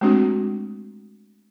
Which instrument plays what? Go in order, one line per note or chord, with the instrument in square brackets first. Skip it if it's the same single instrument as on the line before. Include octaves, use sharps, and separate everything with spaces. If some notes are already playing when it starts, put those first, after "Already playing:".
[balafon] G#3 A3 C4 D4 F#4